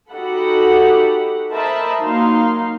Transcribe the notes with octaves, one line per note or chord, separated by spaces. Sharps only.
D#4 F#4 G4 A4 F#5 B5
A#4 C5 D#5 E5 A5 B5
F#3 A#3 D#4 F5 C6